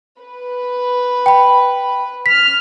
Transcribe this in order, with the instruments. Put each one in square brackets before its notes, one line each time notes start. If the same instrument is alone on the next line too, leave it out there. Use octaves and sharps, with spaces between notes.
[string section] B4
[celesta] G5 B5
[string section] F6 [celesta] B6